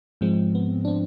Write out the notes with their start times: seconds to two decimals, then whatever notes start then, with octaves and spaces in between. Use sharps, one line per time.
0.21 G#2 F3 G#3 C4
0.55 B3
0.85 D4
0.88 C4